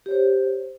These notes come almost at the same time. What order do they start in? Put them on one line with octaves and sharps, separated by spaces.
G4 C#5 C5